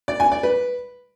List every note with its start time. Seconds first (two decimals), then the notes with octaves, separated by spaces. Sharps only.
0.08 D5
0.20 G#5
0.32 D5
0.43 B4